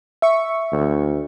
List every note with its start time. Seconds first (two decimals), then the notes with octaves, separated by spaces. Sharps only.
0.22 E5 C#6
0.72 D2